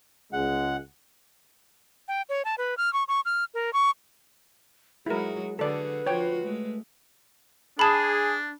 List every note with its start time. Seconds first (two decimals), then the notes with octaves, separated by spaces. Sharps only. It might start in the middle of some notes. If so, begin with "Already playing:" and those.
0.33 C#2 G#3 F#5
2.08 G5
2.29 C#5
2.45 A5
2.58 B4
2.78 F6
2.93 C#6
3.08 C#6
3.26 F6
3.54 A#4
3.73 C#6
5.06 F#3 G#3 E4 F#4 G#4 A#4
5.59 D3 F#4 G#4 A4 B4 D5
6.07 F3 F4 F#4 C#5 G5
6.43 G#3 A3
7.79 D4 G#4 A5 B5